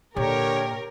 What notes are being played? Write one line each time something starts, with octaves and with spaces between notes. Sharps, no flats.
A#2 D3 G4 A#4 C#5